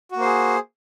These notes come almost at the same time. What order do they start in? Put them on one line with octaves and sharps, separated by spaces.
F#4 A#3 C5 G#4